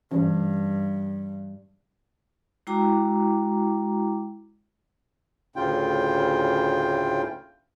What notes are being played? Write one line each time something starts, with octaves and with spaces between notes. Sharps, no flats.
G2 E3 C#4
G#3 E4 F#4 G5 A#5 D6
D2 A2 C#3 F4 G5